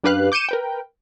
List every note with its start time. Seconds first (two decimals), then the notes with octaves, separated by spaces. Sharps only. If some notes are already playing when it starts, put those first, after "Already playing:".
0.04 F#2 D4 G4 B4 F5 F#6
0.32 D6 G6 C#7 D#7 E7
0.49 A#4 B4 G5